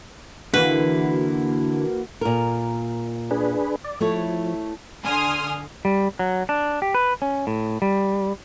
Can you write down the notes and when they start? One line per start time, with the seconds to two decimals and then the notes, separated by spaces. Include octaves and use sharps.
0.54 D3 E3 A#3 E4 F#4 B4
2.21 A#2 A#4
3.31 D4 G#4 B4
3.84 D5
4.01 F3 A3 E4 C#5
5.03 D3 G#5 C6 D#6 F6
5.85 G3
6.19 F#3
6.49 D4
6.82 G4
6.94 B4
7.22 C#4
7.47 A2
7.82 G3